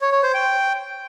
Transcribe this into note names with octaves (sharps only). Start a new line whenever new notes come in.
C#5
C#5
C5
G5